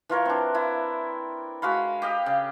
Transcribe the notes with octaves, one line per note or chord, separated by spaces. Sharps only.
E3 F4 A#4 C#5
C4 D4
E4
G#3 F#4 F5 B5
G4 D#5 F5
C#3